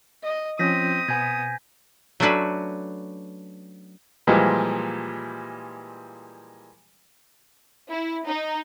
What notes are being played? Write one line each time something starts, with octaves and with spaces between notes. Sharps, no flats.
D#5
F3 C4 C#4 F4 D#6 G6 A#6 B6
B2 B3 G#5 G6 G#6
F#3 A3 C#4 D4 F#4 B4
A#2 E3 F3 G3 G#3
E4
D#4